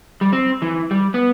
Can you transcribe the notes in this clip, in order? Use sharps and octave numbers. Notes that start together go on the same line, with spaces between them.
G3
C4
E3
G3
B3